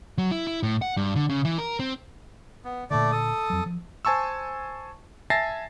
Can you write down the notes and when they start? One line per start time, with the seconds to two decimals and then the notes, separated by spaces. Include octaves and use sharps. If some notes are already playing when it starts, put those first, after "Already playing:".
0.18 F#3
0.31 E4
0.47 E4
0.63 A2
0.82 F#5
0.97 G2
1.16 D3
1.30 C#3
1.45 E3
1.58 A#4
1.79 C4
2.65 B3
2.90 A#2 D3 A3 D5
3.12 A4 D#6
3.50 F2 F#3
3.66 F3
4.05 C5 G#5 A5 C#6 E6
5.30 E5 G#5 A5 A6 A#6 C7